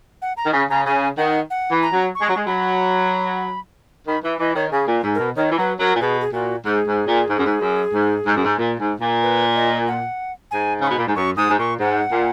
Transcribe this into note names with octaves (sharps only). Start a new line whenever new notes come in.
F#5
A#5
D#3
C#3
C#3 A#5
C#3 G#5
D#3 F#5
F#5
E3
A#5
F#3
C#6
G#3
F#3
G#3
F#3 B5
D#3 B5
E3 E5
E3 D#5
D#3 C#5
C#3 G#4
A#2
G#2
A#4
B2
D#3 C#5
E3
F#3 B4
F#3 A#4
A#2
B2 G#4
G#4
A#2 F#4
G#2 G#4
G#2
A#2
G#2
F#2
G#2
F#2
G#2
G#2
F#2
G#2
A#2
G#2
A#2
B4
D#5
F#5
G#2 G#5
C#3 C#6
B2 B5
A#2
G#2
F#2 C#6
G#2 D#6
G#2
A#2 C#6
G#2 F#5
A#2